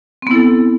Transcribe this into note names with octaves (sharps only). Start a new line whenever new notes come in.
B3 C4 E4 A4